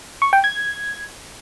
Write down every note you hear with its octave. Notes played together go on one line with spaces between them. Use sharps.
C#6
G5
G#6